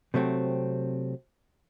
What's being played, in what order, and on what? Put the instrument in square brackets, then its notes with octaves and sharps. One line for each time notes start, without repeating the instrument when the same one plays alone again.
[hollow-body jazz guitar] C3 F#3 A3 C4